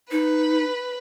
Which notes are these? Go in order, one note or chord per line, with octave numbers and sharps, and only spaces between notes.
D#4 B4